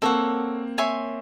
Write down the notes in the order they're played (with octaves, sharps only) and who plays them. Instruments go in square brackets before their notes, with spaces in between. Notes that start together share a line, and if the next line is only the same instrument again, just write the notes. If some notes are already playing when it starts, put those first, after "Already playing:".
[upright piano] A#3 C4 [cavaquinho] A4 C#5 F#5
[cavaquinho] C#5 E5 G#5 C6